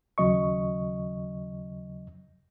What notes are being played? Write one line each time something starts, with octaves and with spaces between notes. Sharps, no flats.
D#2 C#3 F#3 D#5 C#6